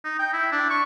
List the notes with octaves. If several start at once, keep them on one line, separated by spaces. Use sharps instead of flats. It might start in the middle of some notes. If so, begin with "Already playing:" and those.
D#4
G5
E4
D4
C#6